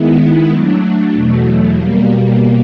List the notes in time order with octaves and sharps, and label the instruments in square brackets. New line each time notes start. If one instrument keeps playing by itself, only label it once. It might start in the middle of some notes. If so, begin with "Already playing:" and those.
Already playing: [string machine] D#3 G#3 B3 E4
F#3 A3 D4
E2 B2 F#3 A3
B2 G3 A#3